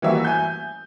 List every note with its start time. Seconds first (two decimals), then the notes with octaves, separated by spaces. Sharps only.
0.02 E3 G3 A#3 F#4 E5
0.25 G#5 G6